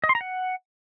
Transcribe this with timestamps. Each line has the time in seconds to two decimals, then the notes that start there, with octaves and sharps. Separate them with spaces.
0.04 D#5
0.09 C6
0.15 A#5
0.21 F#5